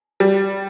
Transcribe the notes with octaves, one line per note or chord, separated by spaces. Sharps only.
G3